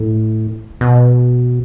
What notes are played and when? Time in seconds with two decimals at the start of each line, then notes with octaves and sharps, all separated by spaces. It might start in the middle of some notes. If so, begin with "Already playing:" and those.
Already playing: A2
0.81 B2